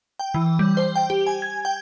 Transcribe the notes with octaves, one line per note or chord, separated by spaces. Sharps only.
G5
E3
G3
C5
G5
G4
G#5
G#6
G5